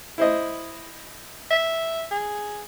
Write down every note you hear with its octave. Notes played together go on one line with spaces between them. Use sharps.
E4 C5 D#5
E5
G#4